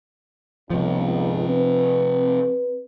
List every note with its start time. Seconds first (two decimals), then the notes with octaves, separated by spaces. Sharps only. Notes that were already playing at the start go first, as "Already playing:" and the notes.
0.70 G1 C#2 C3 F3
1.48 C4 B4